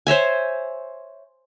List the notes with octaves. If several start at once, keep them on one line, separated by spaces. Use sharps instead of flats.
C5 C#5 E5 G#5